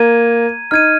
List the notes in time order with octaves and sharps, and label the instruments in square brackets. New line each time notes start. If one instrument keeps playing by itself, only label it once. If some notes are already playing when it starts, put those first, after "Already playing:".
Already playing: [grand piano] A#3 [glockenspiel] A#5 G#6 D#7
[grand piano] D#4 [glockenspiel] F6 G#6 D#7